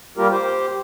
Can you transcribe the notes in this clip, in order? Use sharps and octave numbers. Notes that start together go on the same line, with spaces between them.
G3 A#3 F4 G4 A#4
G4 C5